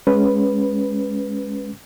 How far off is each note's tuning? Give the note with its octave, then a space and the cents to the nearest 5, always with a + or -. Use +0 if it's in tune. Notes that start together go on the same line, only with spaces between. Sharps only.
G#3 +0 C#4 +0 B4 +0